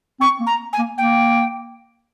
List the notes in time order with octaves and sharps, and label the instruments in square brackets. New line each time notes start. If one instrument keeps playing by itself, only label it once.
[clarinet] C4 [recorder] C#6
[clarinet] A#3
[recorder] A#5
G#5
[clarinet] A#3
[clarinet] A#3 [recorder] G5